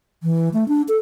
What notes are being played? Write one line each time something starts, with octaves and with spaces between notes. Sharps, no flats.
E3
A3
D4
A4